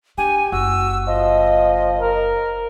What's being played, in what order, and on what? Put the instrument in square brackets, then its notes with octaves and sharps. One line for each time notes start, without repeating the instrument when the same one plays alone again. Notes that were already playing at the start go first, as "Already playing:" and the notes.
[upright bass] D4 [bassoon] G4 [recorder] G#5
[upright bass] F#1 [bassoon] F#4 [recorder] E6
[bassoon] F3 [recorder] D#5
[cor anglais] A#4